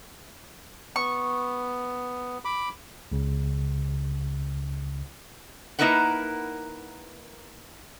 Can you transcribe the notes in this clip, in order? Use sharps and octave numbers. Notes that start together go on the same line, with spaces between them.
B3 C#6
B5 D6
C#2 C#3
A#3 D#4 E4 A#4 B4 F#5